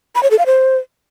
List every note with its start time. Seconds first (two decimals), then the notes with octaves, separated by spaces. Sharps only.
0.15 B5
0.23 C#5
0.31 A4
0.39 F5
0.46 C5